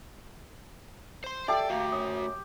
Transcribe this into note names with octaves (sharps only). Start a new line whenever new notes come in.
C5 C6
G4 A4 D5 E5 G5
A3 A#3 F#4
F#2 D#6